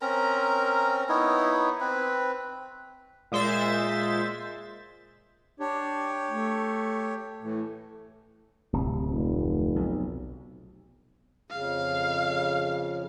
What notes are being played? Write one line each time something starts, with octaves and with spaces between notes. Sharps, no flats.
C4 C#4 A#4 A#5
B3 D#4 E4 C#5
C4 B4
A#2 G#3 C5 E5 A6
D4 G4 C#5
A3
A2 E3
D1 C3
F1
B1
F2 C#3 F5